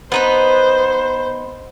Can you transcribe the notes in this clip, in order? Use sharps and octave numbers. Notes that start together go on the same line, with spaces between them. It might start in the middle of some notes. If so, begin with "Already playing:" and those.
B3 D#4 B4 C5